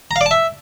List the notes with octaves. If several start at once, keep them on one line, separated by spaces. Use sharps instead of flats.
A#5
F5
D5
A5
E5